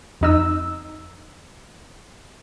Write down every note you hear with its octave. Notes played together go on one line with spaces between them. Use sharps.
F2 D#4 E6